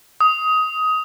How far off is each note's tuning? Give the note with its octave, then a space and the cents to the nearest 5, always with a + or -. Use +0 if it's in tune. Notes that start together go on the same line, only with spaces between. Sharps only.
D#6 +15